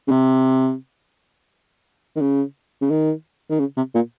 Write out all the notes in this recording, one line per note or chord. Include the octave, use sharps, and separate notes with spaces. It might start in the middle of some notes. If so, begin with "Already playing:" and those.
C#3
C3
D#3
C#3
C#3
D#3
D#3
C#3
C3
A#2